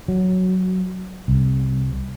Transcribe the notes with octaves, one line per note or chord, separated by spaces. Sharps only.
F#3
C2